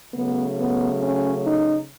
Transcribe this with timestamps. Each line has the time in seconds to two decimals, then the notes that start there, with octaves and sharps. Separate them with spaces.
0.14 C#3 F#3 A3 B3
0.59 B3
1.03 C#4
1.47 D#4